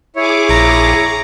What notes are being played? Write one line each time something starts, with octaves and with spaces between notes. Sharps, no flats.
E4 G#4 C#5 D6
A#1 A#5